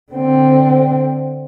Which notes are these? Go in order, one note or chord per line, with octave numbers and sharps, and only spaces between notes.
D3 C4